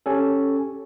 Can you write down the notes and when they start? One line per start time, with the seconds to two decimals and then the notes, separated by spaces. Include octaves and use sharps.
0.06 C#4 G4 A4